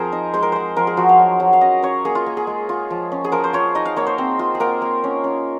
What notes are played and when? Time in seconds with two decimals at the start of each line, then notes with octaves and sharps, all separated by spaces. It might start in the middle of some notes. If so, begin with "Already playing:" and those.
Already playing: F3 C4 G#4 A#4 C5
0.12 D#4
0.34 G#3 C5
0.43 A#4
0.52 G#3 C5
0.76 F3 A#4
0.87 G#4
0.97 F3 F#4
1.09 F5
1.19 F#3
1.40 F#3
1.53 F5
1.61 C#4 D#5
1.83 C#4 C#5
2.05 A#3 G#4
2.15 F4
2.26 A#3
2.37 G#4
2.47 G#3
2.69 F4
2.90 F3
3.12 C#4
3.24 G#4
3.32 F3 A#4
3.44 C5
3.53 F3 C#5
3.75 D#4 D#5
3.85 F5
3.96 A#3 C#5
4.07 C5
4.18 C4
4.39 F4
4.55 G#4
4.60 A#3 A#4
4.82 A#3
5.04 C#4
5.24 C#4